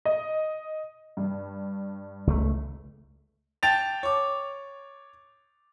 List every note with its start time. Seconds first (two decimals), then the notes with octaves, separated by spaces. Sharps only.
0.05 D#5
1.17 G2
2.27 C#2 F#3 A3
3.63 G5 A5 A6 F7
4.03 C#5 D6